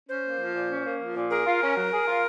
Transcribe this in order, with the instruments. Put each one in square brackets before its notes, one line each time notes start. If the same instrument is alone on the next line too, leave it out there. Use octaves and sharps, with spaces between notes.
[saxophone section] C#4 [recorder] C5
[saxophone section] A#3
F3
A#2
C#4
A#3
F3
A#2
[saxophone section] G#4 [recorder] A#4
[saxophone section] F4
C#4
F#3
G#4
F4